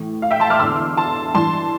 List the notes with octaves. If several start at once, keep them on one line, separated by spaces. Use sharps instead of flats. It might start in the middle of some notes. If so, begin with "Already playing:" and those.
Already playing: A2 E3
F5
E5 G5
A5 C6
D6 F6
E2 D3 C6 E6
A5 C6
G2 E3 A5 C6